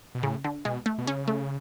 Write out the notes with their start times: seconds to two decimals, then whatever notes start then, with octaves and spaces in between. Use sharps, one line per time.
0.15 B2
0.23 A2 C#3
0.44 D3
0.65 B2 G#3
0.86 A3
0.98 B2
1.07 C#3 C#4
1.28 A3